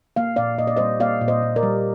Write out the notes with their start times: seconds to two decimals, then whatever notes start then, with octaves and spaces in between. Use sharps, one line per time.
0.16 A#3 F5
0.36 A#2 D5 F5
0.58 A#2 D#5
0.67 D5
0.77 G3 C5 D#5
1.00 A#3 D5 F5
1.21 A#2
1.28 C5 D#5
1.43 A#2
1.56 A#4 D5
1.63 G3